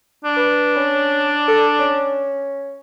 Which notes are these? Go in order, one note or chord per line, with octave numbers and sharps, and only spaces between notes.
D4
B4
C#4
A4
C#4